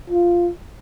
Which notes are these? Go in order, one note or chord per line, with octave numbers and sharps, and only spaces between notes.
F4